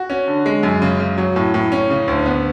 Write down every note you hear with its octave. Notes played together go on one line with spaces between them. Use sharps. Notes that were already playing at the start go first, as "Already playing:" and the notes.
Already playing: F#4
C#4
D3
G#3
F#2
C#3
C#3
F#3
A2
A2
C#4
C#3
D2
B3